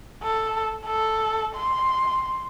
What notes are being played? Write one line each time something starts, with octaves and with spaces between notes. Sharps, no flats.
A4
A4
C6